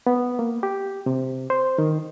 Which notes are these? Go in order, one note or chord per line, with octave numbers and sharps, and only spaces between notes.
B3
A#3
G4
C3
C5
D#3